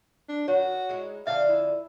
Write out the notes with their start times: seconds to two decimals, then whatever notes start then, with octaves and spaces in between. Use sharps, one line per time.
0.29 D4
0.48 D#3 F#4 C#5
0.89 G#3 D#4 E4
1.27 F2 D3 C#4 E5 F5 A5
1.49 E4